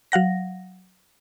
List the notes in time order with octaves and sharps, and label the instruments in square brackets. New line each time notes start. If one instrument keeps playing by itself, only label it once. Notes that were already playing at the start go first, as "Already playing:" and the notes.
[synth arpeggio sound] F#3 F5 F#5 A#6